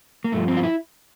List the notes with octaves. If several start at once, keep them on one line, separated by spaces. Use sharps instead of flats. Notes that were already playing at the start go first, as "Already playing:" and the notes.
A#3
G2 F3 A3
C4
F4
E4